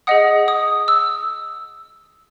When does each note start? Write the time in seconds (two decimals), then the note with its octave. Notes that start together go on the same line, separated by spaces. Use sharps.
0.07 G#4 D#5 F#5 D#6
0.48 D#6
0.88 E6